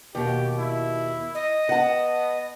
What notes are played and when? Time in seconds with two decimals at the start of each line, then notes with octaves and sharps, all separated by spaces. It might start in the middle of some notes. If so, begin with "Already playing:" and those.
0.15 D#2 B2 G4
0.58 E4
1.35 D#5
1.69 B3 F#5 A5